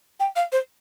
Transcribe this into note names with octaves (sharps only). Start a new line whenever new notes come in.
G5
F5
C5